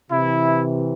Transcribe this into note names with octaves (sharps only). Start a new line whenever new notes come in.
C3 E3 E4